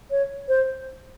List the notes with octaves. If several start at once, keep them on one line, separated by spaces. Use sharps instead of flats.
C#5
C5